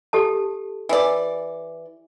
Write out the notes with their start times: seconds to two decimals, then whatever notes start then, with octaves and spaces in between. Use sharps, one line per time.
0.13 G4 A4 A5
0.89 E3 D5